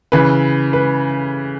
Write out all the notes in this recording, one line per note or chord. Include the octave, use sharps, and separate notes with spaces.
C#3 E3 B4
B4